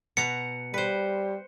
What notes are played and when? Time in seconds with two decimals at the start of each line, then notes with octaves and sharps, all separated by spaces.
0.17 B2 F#5 A#5 C#7
0.74 G3 B4 C5